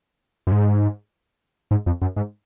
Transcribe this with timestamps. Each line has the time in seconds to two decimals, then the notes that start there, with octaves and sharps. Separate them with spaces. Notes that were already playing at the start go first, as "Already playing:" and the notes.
0.47 F#2
0.52 G#2
1.71 G#2
1.86 F2
2.02 F#2
2.16 G#2